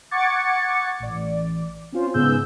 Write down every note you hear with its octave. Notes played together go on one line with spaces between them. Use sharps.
F#5 C#6 D6 G#6 A6 C#7
A1 D5
C4 C#4 F4 C5
G#2 C#3 B3 G#4 E6 G6